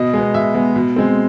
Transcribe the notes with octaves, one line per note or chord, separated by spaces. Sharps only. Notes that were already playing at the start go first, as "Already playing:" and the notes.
Already playing: B2 D#5
G#3 B3
B2 E5
G#3 B3
B2
G#3 C4